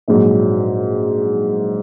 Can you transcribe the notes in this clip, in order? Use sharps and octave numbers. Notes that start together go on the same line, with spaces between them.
A#1 G#2 F#3